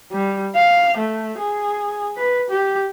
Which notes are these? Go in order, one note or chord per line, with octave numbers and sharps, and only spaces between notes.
G3
F5
A3
G#4
B4
G4